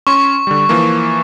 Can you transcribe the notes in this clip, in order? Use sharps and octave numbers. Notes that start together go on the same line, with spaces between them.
C#4 C6 C#6
D3 G3
E3 F3 A#3